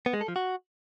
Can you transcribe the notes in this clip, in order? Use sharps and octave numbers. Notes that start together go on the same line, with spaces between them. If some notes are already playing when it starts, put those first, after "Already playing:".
B3
G#3
A4
F3
F#4